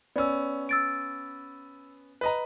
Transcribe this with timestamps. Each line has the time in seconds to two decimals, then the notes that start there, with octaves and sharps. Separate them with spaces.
0.16 B3 C#4 D5 E6
0.69 E6 A6 D7
2.21 B4 D#5 A#5